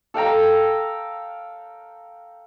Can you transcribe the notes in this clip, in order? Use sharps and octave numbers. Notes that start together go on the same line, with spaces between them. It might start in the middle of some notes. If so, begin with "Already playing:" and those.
A4 F5 G5 A#5